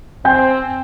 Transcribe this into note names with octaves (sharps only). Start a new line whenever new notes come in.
C4 G5 G#5 G6